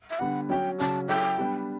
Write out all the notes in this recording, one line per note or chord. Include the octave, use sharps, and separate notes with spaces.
E5
D3 G3 B3 D4 F#5
F#3 C#4 F#4 C#5 G5
C#3 F#3 C#4 F#4 A5
F#3 C#4 E4 A4 C#5 G5
G3 B3 D4